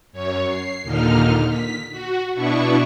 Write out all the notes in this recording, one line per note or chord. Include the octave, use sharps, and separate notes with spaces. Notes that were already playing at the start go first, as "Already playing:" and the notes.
F#2 C#5
C7
D#2 A#2 D3 D#4 F6
B6
F#4
B2 B3 D4 E4 C#6